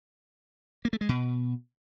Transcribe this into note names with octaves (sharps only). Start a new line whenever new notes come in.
A#3
A3
G#3
B2